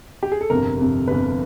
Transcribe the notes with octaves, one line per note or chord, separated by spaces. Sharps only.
G4
G#4
A4
G1 F2 C3 A#4
G1 F2 C3
G1 F2 C3 B4